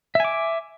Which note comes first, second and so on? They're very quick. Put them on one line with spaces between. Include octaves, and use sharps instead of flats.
E5 G#5 D6